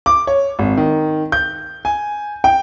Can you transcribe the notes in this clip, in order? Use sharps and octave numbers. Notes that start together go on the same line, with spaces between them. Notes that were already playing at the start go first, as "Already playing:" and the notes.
D6
C#5
G#1
D#3
G6
G#5
G5